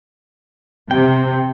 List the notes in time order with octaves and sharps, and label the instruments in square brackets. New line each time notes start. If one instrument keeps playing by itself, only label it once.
[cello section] C3 [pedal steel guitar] G5